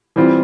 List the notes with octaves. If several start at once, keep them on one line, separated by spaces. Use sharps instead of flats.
E3 G3 C4 F4